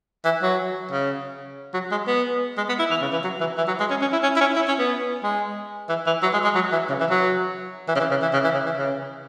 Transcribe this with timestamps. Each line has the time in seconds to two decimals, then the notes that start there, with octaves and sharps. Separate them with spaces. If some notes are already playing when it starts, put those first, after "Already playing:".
0.25 E3
0.42 F#3
0.91 C#3
1.74 F#3
1.92 G#3
2.07 B3
2.57 G#3
2.69 B3
2.79 E4
2.91 E3
3.01 C#3
3.13 E3
3.24 F#3
3.40 E3
3.58 E3
3.68 F#3
3.80 G#3
3.90 C#4
4.01 C#4
4.13 E4
4.23 C#4
4.36 E4
4.41 C#4
4.56 E4
4.68 C#4
4.79 B3
5.24 G#3
5.89 E3
6.06 E3
6.23 F#3
6.33 G#3
6.44 G#3
6.55 F#3
6.72 E3
6.89 C#3
7.00 E3
7.10 F#3
7.88 E3
7.96 C#3
8.00 E3
8.11 C#3
8.22 E3
8.33 C#3
8.44 E3
8.54 C#3
8.66 E3
8.77 C#3